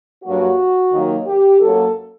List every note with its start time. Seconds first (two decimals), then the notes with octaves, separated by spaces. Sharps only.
0.24 G2 F#3 A#3 F#4
0.93 D#2 D#3 F#3 A#3
1.26 G4
1.60 F#2 F#3 A#3 A4